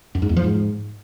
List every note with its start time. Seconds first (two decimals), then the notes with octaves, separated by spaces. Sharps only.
0.15 F#2
0.22 G#2
0.29 E2
0.36 F3
0.44 G#2